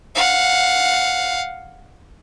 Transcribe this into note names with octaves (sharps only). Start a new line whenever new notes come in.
F5 F#5